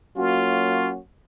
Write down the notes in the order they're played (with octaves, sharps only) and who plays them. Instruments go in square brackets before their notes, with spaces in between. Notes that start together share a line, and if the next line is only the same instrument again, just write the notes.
[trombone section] F#3 A#3 C#4 F#4 [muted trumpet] F4